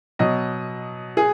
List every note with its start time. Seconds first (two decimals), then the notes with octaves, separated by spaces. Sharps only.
0.19 B2 F#3 D#5
1.17 G#4